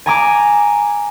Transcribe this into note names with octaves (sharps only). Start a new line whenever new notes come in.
G#5 A#5 D6